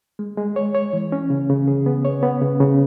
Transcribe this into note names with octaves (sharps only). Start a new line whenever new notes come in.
G#3
G#3
C#5
C#5
E3
C#4
C#3
C#3
G#4
B3
C#5
B3
C#3
C#3